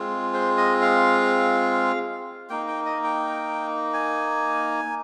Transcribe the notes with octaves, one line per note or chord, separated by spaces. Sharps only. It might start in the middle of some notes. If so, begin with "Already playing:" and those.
Already playing: G#3 C4 F4
C5
D#5
F5
A#3 D#4 G5
G5
D#5
G5
G#5